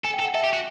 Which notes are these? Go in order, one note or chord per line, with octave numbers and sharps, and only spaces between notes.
A4 G#5
G5
A4
F#5
A4 E5
G4
F#4